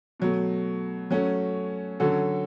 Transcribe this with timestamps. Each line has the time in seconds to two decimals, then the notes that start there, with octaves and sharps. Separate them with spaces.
0.20 B2 F#3 A3
1.10 F#3 A3 C#4 F#4
2.00 D3 F#3 C#4 F#4 A4